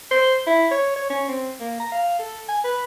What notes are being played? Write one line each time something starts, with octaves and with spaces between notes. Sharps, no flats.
C5
E4
C#5
C#5
C#4
C4
A#3
A#5
F5
A4
G#5
B4